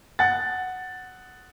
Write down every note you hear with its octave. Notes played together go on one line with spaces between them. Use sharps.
F#5 A6